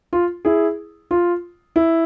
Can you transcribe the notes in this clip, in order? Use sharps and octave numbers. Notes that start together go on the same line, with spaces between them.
F4
E4 G#4
F4
E4